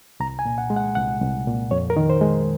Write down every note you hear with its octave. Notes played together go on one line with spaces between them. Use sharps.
C2 A#5
G#5
A#2
F#5
G#3
F#5
C2 F#5
C2
A#2
F2 C#5
A#4
D#3
C5
G#3